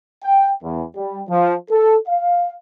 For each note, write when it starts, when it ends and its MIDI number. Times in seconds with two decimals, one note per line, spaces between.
0.23 0.51 79
0.63 0.83 40
0.96 1.23 55
1.29 1.55 53
1.70 1.96 69
2.08 2.53 77